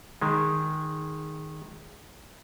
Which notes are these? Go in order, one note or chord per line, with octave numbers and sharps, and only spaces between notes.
D#3 G#3